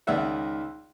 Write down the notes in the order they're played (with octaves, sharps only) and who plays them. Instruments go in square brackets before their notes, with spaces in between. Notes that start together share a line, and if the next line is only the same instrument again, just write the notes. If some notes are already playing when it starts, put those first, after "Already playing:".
[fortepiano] C#2 D#3 D#4 D5 E5 F#5